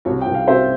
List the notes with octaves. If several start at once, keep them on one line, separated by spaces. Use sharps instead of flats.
C2 C#5
C2 G5
F5
C3 C5 E5